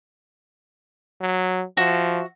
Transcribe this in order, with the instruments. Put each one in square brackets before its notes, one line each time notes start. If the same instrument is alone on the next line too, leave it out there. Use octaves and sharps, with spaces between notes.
[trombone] F#3
[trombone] F3 [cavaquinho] F#4 E5